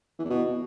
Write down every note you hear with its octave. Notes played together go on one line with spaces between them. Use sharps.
E3
E2
B2